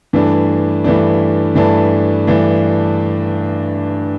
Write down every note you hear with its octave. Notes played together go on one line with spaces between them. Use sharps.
G2 E3 A3 D4
G2 E3 A3 D4
G2 E3 A3 D4
G2 E3 A3 D4